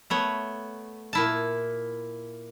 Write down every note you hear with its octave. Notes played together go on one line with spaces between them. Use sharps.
A3 B3 C#5
A#2 E4 A5